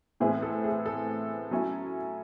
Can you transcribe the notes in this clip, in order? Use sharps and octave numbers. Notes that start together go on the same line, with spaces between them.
A2 E3 C4 E4 G#4
A4
G#4
A4
F#3 C#4 E4